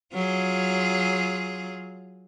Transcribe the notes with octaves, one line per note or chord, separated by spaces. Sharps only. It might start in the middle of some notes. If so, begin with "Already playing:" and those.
F#3 F4 G#4